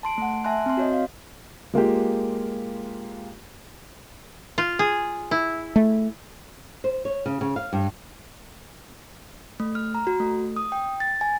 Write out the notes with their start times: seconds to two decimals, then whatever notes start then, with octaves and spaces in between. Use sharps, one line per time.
0.03 A5 C6 D7
0.18 A3 F#5
0.44 E5 G#5 A5 C6 F#6
0.66 C4 C6
0.77 F#4 C#5 D#5
0.92 F5
1.74 G#3 A#3 F4 G4
4.58 F4
4.79 G#4
5.31 E4
5.76 A3
6.84 C5
7.05 C#5
7.26 C#3
7.41 C#3
7.56 F5
7.73 G2
9.60 A3
9.75 F6
9.95 A#5
10.07 F#4
10.20 A3
10.56 D#6
10.72 G5
11.00 A6
11.21 G#5